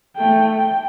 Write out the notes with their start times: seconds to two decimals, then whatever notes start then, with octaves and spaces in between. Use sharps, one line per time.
0.17 A3 G5
0.54 G5